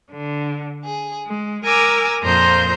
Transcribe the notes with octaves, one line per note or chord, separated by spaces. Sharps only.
D3
G#4
G#3
A#4 G#5 A#5 D6 E6
F2 A#2 C5 A#5 C6 G6